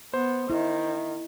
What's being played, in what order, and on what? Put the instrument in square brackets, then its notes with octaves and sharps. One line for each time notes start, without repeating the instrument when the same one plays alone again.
[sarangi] B3 [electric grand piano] C5
[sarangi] D#3 [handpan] E4